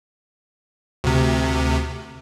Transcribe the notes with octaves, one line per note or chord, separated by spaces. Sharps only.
D2 C3